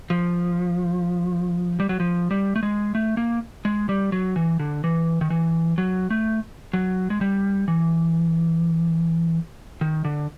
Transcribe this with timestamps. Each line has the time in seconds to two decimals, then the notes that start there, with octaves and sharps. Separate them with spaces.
0.10 F3
1.80 G3
1.89 F#3
2.00 F3
2.31 G3
2.56 A3
2.63 G#3
2.95 A3
3.17 A#3
3.65 G#3
3.89 G3
4.12 F#3
4.36 E3
4.60 D3
4.84 E3
5.21 D#3
5.30 E3
5.78 F#3
6.10 A3
6.73 F#3
7.10 G#3
7.21 G3
7.68 E3
9.81 D#3
10.05 D3